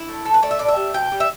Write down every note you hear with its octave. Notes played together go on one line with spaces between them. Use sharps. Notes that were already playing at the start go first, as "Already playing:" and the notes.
Already playing: E4
A3
A2 A4
B4
A3 D5
E5
A2 D5
E5
G3
B2 G5
G3
E5